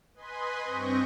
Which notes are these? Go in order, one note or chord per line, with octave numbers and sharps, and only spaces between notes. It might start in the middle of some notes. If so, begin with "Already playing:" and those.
B4 D#5 G#5 B5 C6
G2 C4 D#5 C#6 G6 A#6